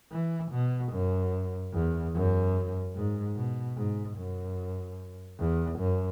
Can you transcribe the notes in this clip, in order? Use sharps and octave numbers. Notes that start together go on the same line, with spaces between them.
E3
B2
F#2
E2
F#2
G#2
B2
G#2
F#2
E2
F#2